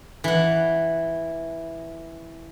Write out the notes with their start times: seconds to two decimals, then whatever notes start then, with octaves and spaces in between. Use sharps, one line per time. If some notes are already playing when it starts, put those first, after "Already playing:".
0.24 E3 F#5